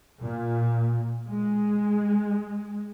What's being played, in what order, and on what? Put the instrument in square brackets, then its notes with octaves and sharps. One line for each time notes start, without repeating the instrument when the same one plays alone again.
[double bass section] A#2
G#3